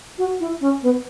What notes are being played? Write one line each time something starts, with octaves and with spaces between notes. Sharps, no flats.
F#4
E4
C#4
B3